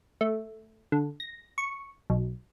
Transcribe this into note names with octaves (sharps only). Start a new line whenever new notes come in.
A3
D3
A#6
C#6
B1